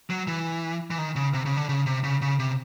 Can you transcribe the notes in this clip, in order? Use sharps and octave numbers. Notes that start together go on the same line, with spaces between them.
F#3
E3
E3
D#3
C#3
C3
C#3
D3
C#3
C3
C#3
C#3
C3